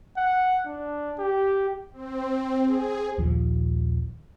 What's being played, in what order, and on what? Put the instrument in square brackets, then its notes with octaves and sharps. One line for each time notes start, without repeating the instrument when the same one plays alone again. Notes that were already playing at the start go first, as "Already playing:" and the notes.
[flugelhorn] F#5
D4
G4
[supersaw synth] C4
G#4
[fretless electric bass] A#1 D#2 F3